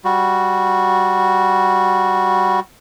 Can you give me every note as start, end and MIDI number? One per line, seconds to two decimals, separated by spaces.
0.05 2.60 55
0.05 2.60 66